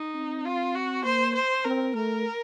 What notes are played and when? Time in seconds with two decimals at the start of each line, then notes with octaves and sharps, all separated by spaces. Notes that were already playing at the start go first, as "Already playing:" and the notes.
Already playing: D#4
0.15 C4
0.45 F4
0.75 F#4
1.05 A#3 C5
1.35 C5
1.65 C4 A#4
1.95 A3 A#4